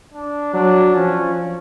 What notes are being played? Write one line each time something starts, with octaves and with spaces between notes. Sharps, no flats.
D4
F#3 D4
F3 C#4